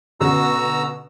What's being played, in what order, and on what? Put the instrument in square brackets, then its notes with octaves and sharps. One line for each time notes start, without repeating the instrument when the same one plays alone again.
[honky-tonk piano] B2 D3 C#4 [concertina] F#4 A#5 E6